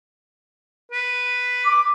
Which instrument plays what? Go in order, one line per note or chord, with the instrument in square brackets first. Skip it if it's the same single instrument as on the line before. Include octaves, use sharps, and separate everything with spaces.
[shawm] B4
[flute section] D6